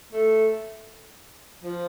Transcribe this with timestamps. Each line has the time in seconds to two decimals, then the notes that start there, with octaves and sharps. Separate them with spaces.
0.13 A3
1.63 F3